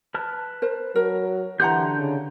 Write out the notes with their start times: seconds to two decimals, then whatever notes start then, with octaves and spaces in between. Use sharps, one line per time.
0.14 B4 A5 F6
0.62 A#4 C5
0.96 F#3 A#4
1.60 D3 E3 G4 F#5 A#5 C6 G6
1.98 C#3